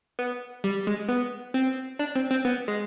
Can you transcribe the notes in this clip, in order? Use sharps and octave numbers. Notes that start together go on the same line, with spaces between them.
B3
G3
G#3
B3
C4
D4
C4
C4
B3
G#3